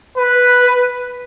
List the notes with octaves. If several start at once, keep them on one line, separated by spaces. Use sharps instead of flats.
B4